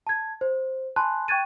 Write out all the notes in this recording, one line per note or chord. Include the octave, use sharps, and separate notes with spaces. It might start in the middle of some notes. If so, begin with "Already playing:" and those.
A5 G#6
C5
G#5 A5 B5 C6 F#6
G5 C#6 F#6 G#6 A6 D#7